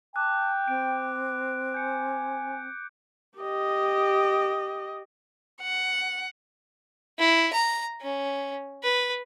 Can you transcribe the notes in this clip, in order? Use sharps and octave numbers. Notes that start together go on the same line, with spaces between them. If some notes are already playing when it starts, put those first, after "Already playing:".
G5 A5 D6 F#6
C4 D7
G#5 G6 C#7
G4 D#5
F#5
E4
A#5
C#4
B4